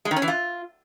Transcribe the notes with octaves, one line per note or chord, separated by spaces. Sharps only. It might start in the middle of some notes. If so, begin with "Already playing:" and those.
G#3
D#3
C#4
E3
F4